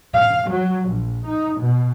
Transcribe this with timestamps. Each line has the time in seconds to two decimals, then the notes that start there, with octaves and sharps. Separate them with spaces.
0.12 F5
0.47 F#3
0.88 A#1
1.25 D#4
1.58 B2